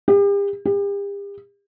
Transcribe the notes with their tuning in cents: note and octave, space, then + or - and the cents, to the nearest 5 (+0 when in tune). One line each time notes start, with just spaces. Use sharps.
G4 +40
G4 +40